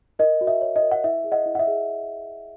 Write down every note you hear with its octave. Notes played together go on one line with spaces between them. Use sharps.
A#4 D#5
F#4
E5
C#5
D#5
A#4
F#5
E4 E5
G#4
D#5 F#5
E4
F#5
E5
G#4